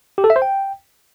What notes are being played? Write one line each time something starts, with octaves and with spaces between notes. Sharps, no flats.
G4
A4
E5
C5
G5